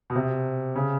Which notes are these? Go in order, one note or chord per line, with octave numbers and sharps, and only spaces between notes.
B2
C3
C#3